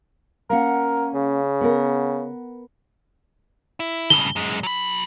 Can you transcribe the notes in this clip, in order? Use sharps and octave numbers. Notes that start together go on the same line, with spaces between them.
A#3 C#4 A#4 F#5
C#3
B3 A#4
E4
G2 C#3 G7
F#2 G#3
F#3 B5